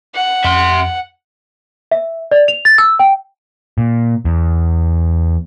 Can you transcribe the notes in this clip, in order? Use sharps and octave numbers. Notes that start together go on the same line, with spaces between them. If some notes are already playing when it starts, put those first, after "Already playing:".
F#5
F2 E5 C6
E5
D5
F7
A6
E6
G5
A#2
E2